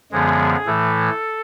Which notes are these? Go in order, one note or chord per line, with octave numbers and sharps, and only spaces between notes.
F#2 D3 F3 G#3 B3 G#4
A2 E3 A3 A4